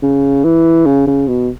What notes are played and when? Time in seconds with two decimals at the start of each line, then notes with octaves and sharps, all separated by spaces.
0.03 C#3
0.44 E3
0.86 C#3
1.07 C#3
1.28 B2